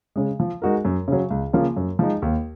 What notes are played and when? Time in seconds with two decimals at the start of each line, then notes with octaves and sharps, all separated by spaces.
0.16 C#3 G#3
0.40 F3
0.62 G#3 D#4 F#4 A#4
0.85 F#2
1.08 C#3 F#3
1.30 C#2
1.53 C#3 F3 A#3 F4
1.76 F#2
1.99 F3 G#3 D#4
2.22 D#2